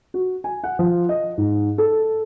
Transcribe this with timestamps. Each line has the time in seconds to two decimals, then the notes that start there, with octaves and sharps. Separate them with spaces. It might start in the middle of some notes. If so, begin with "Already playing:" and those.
0.14 F#4
0.44 G#5
0.64 F#5
0.79 F3
1.09 D#5
1.38 G#2
1.78 A4